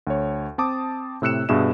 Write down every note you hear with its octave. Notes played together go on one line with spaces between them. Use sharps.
D2 C#5
C4 A5 D6 D#6
A2 C3 E6 F#6 C#7 E7
G2 B2 G#4 E5 E7